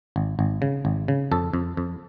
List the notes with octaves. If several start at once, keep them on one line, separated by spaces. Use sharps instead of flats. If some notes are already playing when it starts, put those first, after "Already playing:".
G#1
G#1
C#3
G#1
C#3
F2 A4
F2
F2